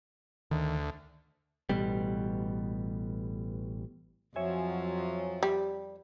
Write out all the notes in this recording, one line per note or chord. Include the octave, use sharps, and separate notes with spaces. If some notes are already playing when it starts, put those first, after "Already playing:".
D2 D#3
A1 B2 G3
F2 F3 F#3 C#5 E5 G#5
G3